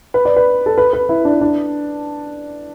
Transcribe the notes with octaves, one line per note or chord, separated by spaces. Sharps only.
B4
D5
B4
A4
B4
B4
E4
D4
D4